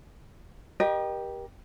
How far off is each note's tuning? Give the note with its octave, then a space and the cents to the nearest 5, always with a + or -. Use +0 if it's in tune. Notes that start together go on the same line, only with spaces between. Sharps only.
G4 +0 A#4 +35 D#5 -25